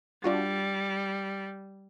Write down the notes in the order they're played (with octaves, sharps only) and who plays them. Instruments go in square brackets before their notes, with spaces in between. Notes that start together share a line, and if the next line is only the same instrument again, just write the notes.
[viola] G3 [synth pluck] D4 F4 F#4